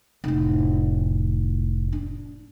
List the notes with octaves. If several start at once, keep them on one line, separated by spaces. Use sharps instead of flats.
F1 A2
D4